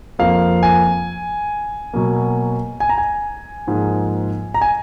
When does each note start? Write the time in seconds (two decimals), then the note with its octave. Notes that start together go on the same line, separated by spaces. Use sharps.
0.19 F2 F3 A#3 F5
0.63 G#5
1.93 B2 F#3 A#3
2.80 G#5
2.89 A#5
2.98 G#5
3.67 G#2 F3 A#3
4.54 A#5
4.62 G#5